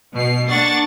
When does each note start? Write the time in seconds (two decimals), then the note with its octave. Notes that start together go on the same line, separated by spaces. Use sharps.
0.13 B2 C7
0.48 A#3 D4 F#5 C#6 A6